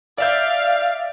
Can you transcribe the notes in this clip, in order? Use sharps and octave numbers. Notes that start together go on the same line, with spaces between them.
D5 E5 F5 G6